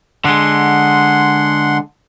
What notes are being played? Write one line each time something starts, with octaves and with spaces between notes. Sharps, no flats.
D3 G#3 F#5 C6